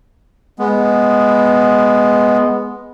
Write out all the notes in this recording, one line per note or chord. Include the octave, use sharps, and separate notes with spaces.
G#3 B3